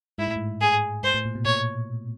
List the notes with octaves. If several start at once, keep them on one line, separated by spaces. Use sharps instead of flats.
G#2 E4
A2
G#2
G#4
G#2 C5
A2
A#2
B2
A#2 C#5